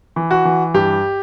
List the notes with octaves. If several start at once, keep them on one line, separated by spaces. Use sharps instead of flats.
E3
F#4
E3
G2 G4